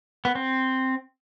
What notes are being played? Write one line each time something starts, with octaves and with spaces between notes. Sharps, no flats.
B3
C4